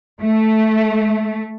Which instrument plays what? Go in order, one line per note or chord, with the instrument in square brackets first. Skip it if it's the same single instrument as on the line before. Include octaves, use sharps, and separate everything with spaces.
[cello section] A3